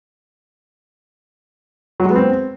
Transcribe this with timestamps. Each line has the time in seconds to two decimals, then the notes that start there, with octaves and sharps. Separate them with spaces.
2.00 F#3
2.05 G#3
2.10 B3
2.16 C4